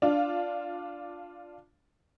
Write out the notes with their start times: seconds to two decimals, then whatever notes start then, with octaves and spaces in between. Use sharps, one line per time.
0.02 D4 F4